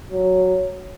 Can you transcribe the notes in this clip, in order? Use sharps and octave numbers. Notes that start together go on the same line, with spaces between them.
F#3